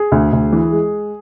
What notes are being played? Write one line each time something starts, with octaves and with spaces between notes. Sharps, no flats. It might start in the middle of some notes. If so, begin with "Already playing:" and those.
Already playing: G#4
D2
D2
E3
G#3